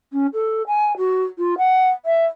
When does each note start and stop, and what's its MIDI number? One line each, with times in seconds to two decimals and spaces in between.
0.12 0.26 61
0.33 0.62 69
0.66 0.96 80
0.97 1.24 66
1.38 1.54 65
1.57 1.89 78
2.05 2.25 76